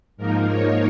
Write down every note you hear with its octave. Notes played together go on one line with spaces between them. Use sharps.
G#2 F3 A#3 D#4 A#4
C#5